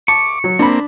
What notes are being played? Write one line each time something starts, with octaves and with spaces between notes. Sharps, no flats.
A5 C#6 D6
F#3
A#3 C4 D4 B5